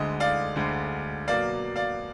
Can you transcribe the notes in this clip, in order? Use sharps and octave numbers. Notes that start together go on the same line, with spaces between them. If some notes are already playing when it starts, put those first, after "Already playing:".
Already playing: D2 D3 G#3 D#5
D5 F5
D2 D3 G#3
B2 F#3 A#3 D5 F5
D5 F5